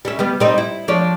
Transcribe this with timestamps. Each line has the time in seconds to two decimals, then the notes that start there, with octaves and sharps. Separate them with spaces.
0.05 G3 C#4 E5
0.19 G3 B3 G4
0.40 G3 C4 D#4
0.58 E4
0.88 F3 D4 C#5